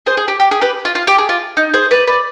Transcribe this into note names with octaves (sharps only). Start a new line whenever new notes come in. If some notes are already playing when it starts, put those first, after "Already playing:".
G#4 C5
G#4
G4
G4
G#4
G4 B4
F4
F4
G4
G#4
F4
D#4
G#4 C5
B4 D5
B4 D5